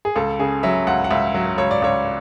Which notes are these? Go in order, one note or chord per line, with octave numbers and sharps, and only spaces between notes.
G#4
C#2 A4
C#3 G#4
F#3 E5
C#2 F#5
F#5
C#2 E5
F#3
C#2 C#5
D5
C#2 C#5